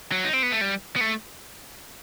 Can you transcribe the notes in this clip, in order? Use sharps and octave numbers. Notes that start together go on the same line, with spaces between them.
F#3
D#4
C4
B3
A3
G3
B3
A3